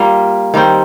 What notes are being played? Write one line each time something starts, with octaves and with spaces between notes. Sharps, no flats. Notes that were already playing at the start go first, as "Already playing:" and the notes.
Already playing: G3 A#3 F4
D#3 G3 C4